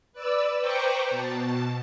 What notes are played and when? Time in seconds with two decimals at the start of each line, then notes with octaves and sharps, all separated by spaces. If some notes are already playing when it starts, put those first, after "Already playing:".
0.13 B4 D5 E6
0.60 B4 C5 G5 A#5 C#6 D6
1.09 B2 A5